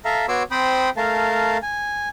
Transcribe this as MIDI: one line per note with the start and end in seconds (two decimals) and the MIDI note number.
0.05 0.26 69
0.05 0.26 76
0.05 0.26 77
0.05 0.26 82
0.28 0.43 59
0.28 0.43 66
0.28 0.43 73
0.28 0.43 84
0.28 0.43 86
0.28 0.43 88
0.51 0.90 60
0.51 0.90 72
0.51 0.90 79
0.51 0.90 83
0.51 0.90 87
0.97 1.58 57
0.97 1.58 70
0.97 1.58 77
0.97 1.58 81
1.63 2.09 80